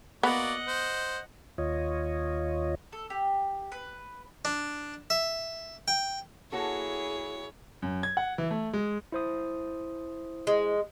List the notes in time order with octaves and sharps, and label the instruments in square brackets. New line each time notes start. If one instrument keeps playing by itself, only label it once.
[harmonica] A#3 F#4 D5 [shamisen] B3 [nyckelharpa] D#5 F#5
[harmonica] C5
[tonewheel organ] D#2 F4 C#5 D#5
[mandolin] A4
G4
B4
[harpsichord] D4
E5
G5
[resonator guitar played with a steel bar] A#3 F#4 A4 [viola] E4 G#4 [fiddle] C#5
[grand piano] F#2
G#6
F#5
E3
A3
G#3
[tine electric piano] E4 C5 D#6
[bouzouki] G#3